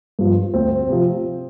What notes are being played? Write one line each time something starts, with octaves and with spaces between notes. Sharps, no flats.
G2 F3
D2 C4
C3 F3